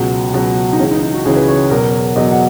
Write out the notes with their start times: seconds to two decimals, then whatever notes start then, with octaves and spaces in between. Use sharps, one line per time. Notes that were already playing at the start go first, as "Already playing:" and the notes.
Already playing: C#2 B2 F#3
0.33 C#2 B2 F#3
0.73 D#4
0.80 C#2 C#3 E3 C#4
0.91 D#4
1.02 D#4
1.14 F#4
1.25 C#2 C#3 E3 G#4
1.36 B4
1.48 C#5
1.70 E2 B2 F#3 A#4
2.16 E2 B2 F#3 D#5
2.31 F#5